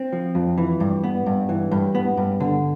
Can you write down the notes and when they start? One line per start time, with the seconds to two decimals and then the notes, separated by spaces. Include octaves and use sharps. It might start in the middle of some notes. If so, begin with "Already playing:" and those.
Already playing: C4
0.13 F3
0.35 F2
0.58 E3
0.80 G2
1.04 B3
1.26 G2
1.49 E3
1.71 G2
1.95 B3
2.17 G2
2.40 D3